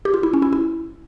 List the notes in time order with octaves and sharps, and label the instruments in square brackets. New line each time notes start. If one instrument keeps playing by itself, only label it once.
[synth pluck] G4
F4
E4
C#4
E4
E4